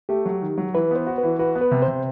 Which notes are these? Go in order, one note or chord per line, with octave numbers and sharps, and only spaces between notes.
A3 G4
F#3
D#3
F#3
E3 B4
B3 C5
F#4
B4
E3
F#4 B4
B3
B4
C3
C5
C3